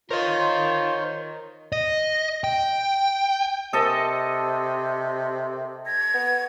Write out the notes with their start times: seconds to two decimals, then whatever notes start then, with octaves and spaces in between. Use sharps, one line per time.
0.10 F4 A#4 C5 C#5 D#5
1.72 D#5
2.44 G5
3.73 C3 A4 A#4 C5 D#5 A5 D#6
5.86 G#6 A#6
6.14 B3